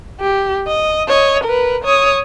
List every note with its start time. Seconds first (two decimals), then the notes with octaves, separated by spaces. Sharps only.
0.21 G4
0.67 D#5
1.08 C#5 D#5
1.44 A#4 B4
1.84 C#5 D#6